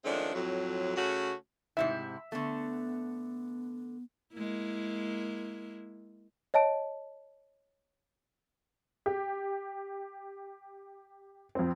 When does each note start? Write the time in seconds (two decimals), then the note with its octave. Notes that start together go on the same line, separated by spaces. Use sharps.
0.05 D#3 F3 G#3 A3 C#4 D4
0.35 F2 A2 F#3
0.96 C#3 A3 C#4 F#4
1.77 G#2 C3 E4 E5
2.32 D3 A3 B3
4.33 G#3 A#3 E4
6.54 C#5 D#5 A5 D7
9.06 G4
11.55 F2 C4